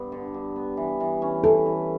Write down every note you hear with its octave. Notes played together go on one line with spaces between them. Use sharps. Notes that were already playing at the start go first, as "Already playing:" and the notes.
Already playing: G2 B3
D3
G2
B3
E3
E3
C#4
E3 A4
E3